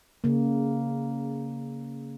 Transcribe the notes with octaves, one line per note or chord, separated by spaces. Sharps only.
C#3 A#3